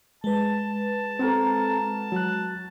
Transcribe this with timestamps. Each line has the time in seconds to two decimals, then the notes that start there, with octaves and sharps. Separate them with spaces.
0.24 G#3 B4 A5
1.19 C4 F#4 A4 A#4 A#5
2.12 F#3 F#6